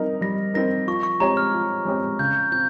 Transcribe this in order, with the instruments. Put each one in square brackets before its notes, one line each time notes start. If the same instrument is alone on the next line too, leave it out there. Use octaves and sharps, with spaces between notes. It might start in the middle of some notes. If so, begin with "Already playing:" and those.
Already playing: [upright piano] G3 C4 D#4 A#4
[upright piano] G3 [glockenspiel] A#6
[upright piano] C4 D#4 A#4 [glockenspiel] A#6
[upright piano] F3 [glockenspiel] C#6
[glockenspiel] C#6
[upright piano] G#3 C4 G4 C#5 [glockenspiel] A#5
[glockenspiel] F6
[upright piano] F3
G#3 C4 G4 C#5
[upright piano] C#3 [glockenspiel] G6
[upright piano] F3 C4 F4 [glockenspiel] G6